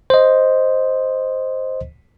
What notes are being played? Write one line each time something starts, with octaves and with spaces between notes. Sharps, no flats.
C5 D#5